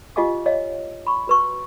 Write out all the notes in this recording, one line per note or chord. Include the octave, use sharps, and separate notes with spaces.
F4 G4 D#5 F5 G#5 D6
C#5 D#5 F5
B5 C#6
F#4 B4 C#6